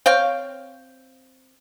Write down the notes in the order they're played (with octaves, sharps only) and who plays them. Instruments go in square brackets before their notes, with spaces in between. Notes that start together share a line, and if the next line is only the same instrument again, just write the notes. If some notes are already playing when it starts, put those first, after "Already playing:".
[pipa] C4 C#5 F5 G5